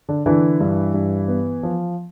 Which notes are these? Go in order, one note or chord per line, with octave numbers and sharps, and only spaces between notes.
D3 D4
D3 E3 E4
G2
G2
B3
F3